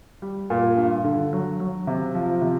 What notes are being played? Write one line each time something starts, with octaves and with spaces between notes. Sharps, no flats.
G3
A#2
G2
D3
F#3
F#3
C3
F3
C3